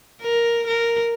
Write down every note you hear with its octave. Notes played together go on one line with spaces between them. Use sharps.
A#4
A#4